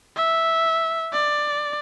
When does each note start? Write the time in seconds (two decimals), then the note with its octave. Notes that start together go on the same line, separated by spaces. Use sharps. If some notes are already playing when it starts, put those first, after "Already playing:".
0.16 E5
1.13 D5